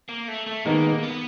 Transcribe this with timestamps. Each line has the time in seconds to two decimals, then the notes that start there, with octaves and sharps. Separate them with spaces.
0.09 A#3
0.28 A3
0.46 A3
0.65 D#3 G#3 A#3 B3 D#4
1.03 B3